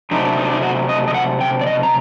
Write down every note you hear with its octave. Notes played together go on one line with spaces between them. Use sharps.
C3 F#3 A3 D4 D#4
D#4
D4
D#4
F#4
D#5
D#5
F#5
G5
D5
D#5
A#5